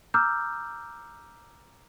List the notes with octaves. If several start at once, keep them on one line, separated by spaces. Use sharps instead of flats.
A#5 D6 E6 F6 G6